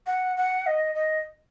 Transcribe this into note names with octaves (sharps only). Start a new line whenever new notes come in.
F#5
F#5
D#5
D#5